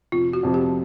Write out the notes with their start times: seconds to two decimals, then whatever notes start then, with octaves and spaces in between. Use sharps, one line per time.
0.12 F1 F4
0.33 F#4
0.43 F2 C3 F3
0.54 G4